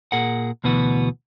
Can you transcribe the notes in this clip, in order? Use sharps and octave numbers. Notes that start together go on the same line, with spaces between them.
A#2 G#4 A#4 F#5
D2 B2 E3 B3 F#4